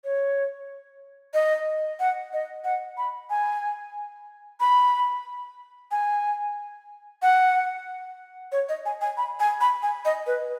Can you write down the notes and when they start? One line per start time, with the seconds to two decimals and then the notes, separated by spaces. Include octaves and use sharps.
0.04 C#5
1.34 D#5
2.00 F#5
2.33 D#5
2.65 F#5
2.98 B5
3.30 G#5
4.60 B5
5.91 G#5
7.22 F#5
8.52 C#5
8.69 D#5
8.86 G#5
9.01 G#5
9.17 B5
9.40 G#5
9.61 B5
9.83 G#5
10.05 D#5
10.27 B4